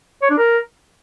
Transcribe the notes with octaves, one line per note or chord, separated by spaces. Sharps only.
C#5
D4
A#4